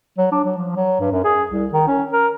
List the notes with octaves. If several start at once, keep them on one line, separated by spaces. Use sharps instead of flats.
F#3
D4
F#3
F3
F#3
G2
F#2
G#4
C2
D#3
C#4
A#4